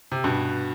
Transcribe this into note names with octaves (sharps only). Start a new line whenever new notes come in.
C3
G2 B2